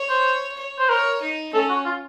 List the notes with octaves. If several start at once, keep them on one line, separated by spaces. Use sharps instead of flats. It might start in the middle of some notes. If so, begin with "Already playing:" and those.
Already playing: C#5
C5
C#5
C5
A#4 C#5
D#4
C#4 A4
F#4
F4